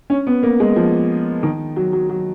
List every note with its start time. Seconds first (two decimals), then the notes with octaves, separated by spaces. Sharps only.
0.10 C#4
0.27 B3
0.43 A#3
0.60 G#3
0.76 F3
1.43 D#3
1.76 F#3
1.93 F#3
2.10 F#3